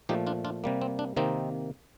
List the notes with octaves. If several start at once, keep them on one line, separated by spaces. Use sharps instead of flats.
A#2 F3 A3 D#4 G4
D4 F4
D4 F4
C3 G3 A#3
C4
D4
C3 D#3 A#3 C4 D#4